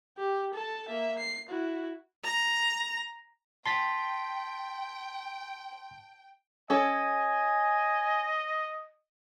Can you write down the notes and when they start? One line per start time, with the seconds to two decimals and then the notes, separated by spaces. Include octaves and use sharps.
0.17 G4
0.54 A4 A5
0.88 A#3 E5
1.18 C7
1.48 E4 F#4
2.24 A#5
3.66 G5 A5 C6 A6 B6
6.70 C#4 A4 D#5 G#5